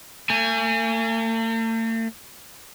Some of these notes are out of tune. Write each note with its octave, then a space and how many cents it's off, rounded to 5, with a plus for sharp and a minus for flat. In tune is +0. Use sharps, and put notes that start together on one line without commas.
A3 +45 G#5 +0